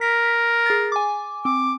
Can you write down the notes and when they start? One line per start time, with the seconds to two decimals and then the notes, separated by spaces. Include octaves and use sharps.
0.01 A#4 B6
0.66 G#4 A6
0.92 G#5 D6
1.45 C4 D6